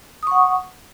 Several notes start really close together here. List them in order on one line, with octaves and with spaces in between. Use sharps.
D#6 C#6 F#5